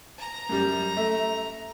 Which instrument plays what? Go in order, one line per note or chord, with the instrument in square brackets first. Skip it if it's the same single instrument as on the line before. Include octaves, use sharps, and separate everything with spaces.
[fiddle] A#5
[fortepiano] F#2 G3
A3 E5